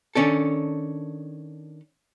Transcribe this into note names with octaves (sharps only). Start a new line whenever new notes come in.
D#3 C#4 D4 A4